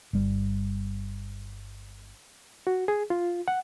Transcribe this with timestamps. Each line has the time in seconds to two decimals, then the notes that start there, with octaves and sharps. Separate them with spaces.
0.13 G1 G3
2.67 F#4
2.88 G#4
3.10 F4
3.48 F#5